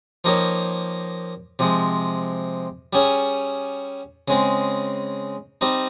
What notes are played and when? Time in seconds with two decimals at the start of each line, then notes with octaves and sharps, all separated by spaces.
0.24 F3 A#3 D#4 G4 C#5
1.59 C3 F3 G#3
2.93 G3 C#4 G#4 C#5
4.28 C#3 G#3 C4
5.61 G3 C4 D#4